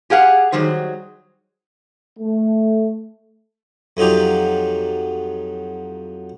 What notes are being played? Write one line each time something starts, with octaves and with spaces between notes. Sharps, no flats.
G4 G#4 F5 F#5
D#3 F#3 G3 G#4 C5
A3
F2 F#3 D#4 F4 G4